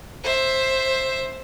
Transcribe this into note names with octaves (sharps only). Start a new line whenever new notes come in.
C5 E5